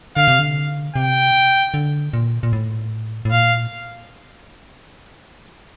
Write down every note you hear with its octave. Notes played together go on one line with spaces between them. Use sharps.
D3 F5
C3
D3
C3 G5
D3
A#2
A#2
A2
A2
A#2 F5